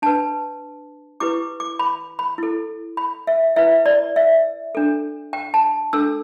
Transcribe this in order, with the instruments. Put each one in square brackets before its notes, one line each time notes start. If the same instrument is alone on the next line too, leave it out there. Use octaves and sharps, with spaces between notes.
[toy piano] D4 B4 A5
E4 G4 B4 D6
D6
B5
B5
E4 A4
B5
E5
E4 B4 E5
D5
E5
D4 A4
G5
A5
D4 A4 E6